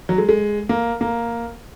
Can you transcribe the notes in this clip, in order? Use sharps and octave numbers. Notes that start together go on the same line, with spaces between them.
F#3
G#3
G#3
A#3
A#3